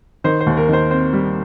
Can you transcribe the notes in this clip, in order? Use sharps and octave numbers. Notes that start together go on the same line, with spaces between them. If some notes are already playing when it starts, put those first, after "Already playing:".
D#3 C5
C5
D#2
A#4
D#3 C5
C4 C5
G3